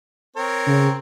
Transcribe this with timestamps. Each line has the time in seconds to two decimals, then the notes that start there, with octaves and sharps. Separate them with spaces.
0.36 C4 A#4 C#5
0.67 C#3